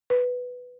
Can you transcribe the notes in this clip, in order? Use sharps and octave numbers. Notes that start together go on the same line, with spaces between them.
B4